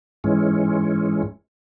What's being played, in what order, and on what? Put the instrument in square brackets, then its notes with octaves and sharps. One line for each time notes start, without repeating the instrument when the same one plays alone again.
[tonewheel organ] G#2 E3 G#3 C#4